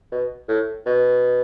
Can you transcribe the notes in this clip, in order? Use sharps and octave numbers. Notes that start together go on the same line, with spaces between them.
B2
A2
B2